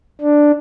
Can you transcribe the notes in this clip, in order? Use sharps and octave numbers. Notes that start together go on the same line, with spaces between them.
D4